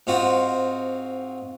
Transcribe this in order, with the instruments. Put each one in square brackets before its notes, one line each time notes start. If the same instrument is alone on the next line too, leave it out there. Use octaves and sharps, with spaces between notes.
[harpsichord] G#2 C4 F4 F#4